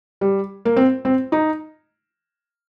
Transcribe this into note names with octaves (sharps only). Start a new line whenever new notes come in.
G3
A#3
C4
C4
D#4